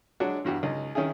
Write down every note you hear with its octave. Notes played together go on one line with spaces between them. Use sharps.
F#3 G#3 D4 F#4
E2 G2 F#4 G4
C#2 D#4
D#3 C#4 E4 G#4